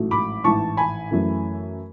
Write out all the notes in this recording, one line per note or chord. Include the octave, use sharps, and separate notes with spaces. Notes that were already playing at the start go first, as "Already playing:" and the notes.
Already playing: A1 G#2 F#3 A3
B5 D6
A1 G#2 E3 A5 C#6
G#5 B5
F#2 E3 A3